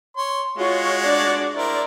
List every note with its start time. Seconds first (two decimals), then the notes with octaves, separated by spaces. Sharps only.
0.17 C#5 C6
0.57 G#3 F4 F#4 C#5
1.04 D4 D5
1.55 E4 A#4 C5 D5